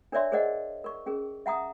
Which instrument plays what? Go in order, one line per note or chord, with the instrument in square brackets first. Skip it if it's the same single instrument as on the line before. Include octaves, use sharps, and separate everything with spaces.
[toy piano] D4 A#4 C#5 D5 E5 C6
G#4 A#4 C5 D5 D#5 F#5
A#4 C#6
C#4 G#4 A#4
E5 F#5 A#5 D#6